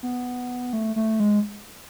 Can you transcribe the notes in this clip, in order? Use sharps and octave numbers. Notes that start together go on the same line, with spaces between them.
B3
A3
A3
G#3